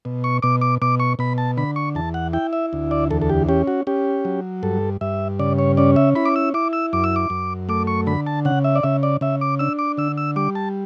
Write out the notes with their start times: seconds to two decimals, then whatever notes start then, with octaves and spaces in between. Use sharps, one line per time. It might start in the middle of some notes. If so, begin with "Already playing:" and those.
0.05 B2
0.24 C#6
0.42 B2 D6
0.61 D6
0.82 B2 D6
1.00 C#6
1.19 B2 B5
1.38 A5
1.57 D3 B5
1.76 C#6
1.95 E2 A5
2.14 F#5
2.33 E4 G5
2.53 E5
2.73 D2
2.91 D5
3.11 E2 A4
3.22 A4
3.30 G4
3.49 C#4 G4
3.68 F#4
3.87 C#4 G4
4.25 F#3
4.63 G2 A4
5.01 G2 E5
5.39 C#3 D5
5.58 C#5
5.77 C#4 D5
5.96 E5
6.15 E4 B5
6.25 D6
6.36 E6
6.54 E4 D6
6.73 E6
6.93 F#2 D6
7.04 E6
7.16 D6
7.30 F#2
7.69 A3 D6
7.87 C#6
8.07 D3 B5
8.26 A5
8.45 C#3 F#5
8.64 E5
8.75 D5
8.83 C#3 E5
9.03 D5
9.21 C#3 E5
9.41 D6
9.59 D4 E6
9.79 D6
9.97 D3 E6
10.18 E6
10.36 G3 D6
10.55 A5